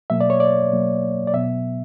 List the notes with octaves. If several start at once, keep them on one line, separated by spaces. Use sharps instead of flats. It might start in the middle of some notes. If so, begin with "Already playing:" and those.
B2 F#3 A#3 E5
D5
C#5
D5
B2 F#3 A#3
D5
B2 F#3 B3 E5